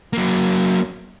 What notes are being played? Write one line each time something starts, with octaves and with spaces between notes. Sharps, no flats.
F#3 A#3